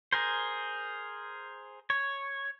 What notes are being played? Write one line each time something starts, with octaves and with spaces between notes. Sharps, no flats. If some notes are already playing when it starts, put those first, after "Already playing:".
G#4 A#4 C5
C#5